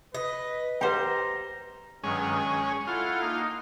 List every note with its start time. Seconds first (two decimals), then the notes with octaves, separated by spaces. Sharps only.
0.14 B4 D#5
0.81 G4 B4 C5 F#5 G5 A#5
2.04 G2 D#3 F#3 G#3 C#4
2.47 C#6
2.87 E4 F4 A4 F#5
3.21 A#3 D#4